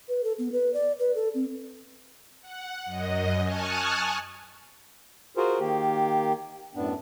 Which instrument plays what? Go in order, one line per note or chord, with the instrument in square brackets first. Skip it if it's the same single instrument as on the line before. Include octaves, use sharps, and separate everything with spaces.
[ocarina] B4
A4
B3
B4
D5
B4
A4
C4
[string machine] F#5
F#2 D#5
G#5 A5 C#6 D#6 F6 F#6
[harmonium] F4 F#4 G#4 A#4 C5
D#3 A#3 G4
F#2 A2 B3 D4